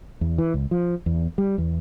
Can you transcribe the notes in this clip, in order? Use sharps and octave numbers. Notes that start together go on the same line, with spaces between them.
E2
E3
C#2
F3
E2
G3
E2